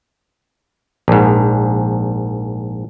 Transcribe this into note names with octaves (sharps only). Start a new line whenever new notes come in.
A#1 G#2